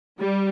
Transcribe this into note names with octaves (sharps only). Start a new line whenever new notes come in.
G3